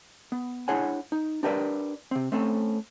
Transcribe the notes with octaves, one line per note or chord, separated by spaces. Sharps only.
B3
D4 E4 G#4 C#5 F#5 G#5
D#4
D4 G4 A#4 B4 D5
C3 C4
A3 C4 C#4 A4